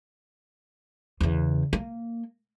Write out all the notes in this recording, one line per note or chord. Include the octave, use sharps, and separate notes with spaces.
E2 C#3
A#3